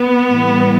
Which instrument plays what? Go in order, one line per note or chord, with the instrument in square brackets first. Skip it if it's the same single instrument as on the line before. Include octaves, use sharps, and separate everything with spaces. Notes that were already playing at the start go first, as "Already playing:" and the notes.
Already playing: [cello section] B3
A2 E3 G3